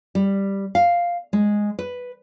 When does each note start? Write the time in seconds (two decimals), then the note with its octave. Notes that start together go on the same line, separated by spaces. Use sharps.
0.15 G3
0.75 F5
1.33 G#3
1.79 B4